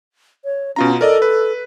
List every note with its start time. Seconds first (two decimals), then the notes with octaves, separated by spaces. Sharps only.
0.45 C#5
0.76 B2 C#4 F4 A#5
1.01 A4 A#4 D5 D#5
1.22 B4